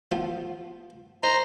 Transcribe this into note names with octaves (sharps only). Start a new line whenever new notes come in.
F3 B3 F4
D#4 C5 A#5